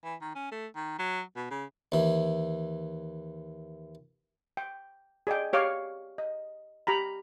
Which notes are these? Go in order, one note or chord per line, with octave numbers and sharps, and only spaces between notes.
E3
D#3
C#4
A3
D#3
F#3
B2
C#3
D#2 E3
G5
G#4 D5 D#5 G5
G4 C#5 F5 C#6 D6
D#5
G4 A#5 B5